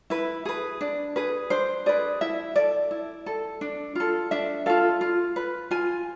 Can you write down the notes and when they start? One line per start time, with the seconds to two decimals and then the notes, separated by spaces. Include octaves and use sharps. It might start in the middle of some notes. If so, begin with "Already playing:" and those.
0.10 E4 B4
0.45 G#4 B4
0.81 D4
1.16 G#4 B4
1.50 D4 C5
1.86 G#4 B4 D5
2.21 E4 E5
2.56 A4 D5
2.91 E4
3.26 A4
3.61 D4
3.95 F4 A4
4.31 D4 E5
4.66 F4 A4 F5
5.01 F4
5.36 B4
5.71 F4 G#5